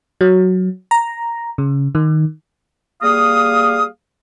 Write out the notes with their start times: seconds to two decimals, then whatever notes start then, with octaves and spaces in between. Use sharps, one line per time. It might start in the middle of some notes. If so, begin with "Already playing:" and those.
0.21 F#3
0.91 A#5
1.58 C#3
1.95 D#3
3.02 G3 A#3 G#4 F5 D#6